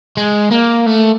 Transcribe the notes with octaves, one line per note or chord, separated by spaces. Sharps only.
G#3
A#3
A3